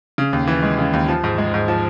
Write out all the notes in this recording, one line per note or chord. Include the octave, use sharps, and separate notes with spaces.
C#3
D#2
E3
G#3
C#3
D#2
F3
G#2
G#3
G#2
F3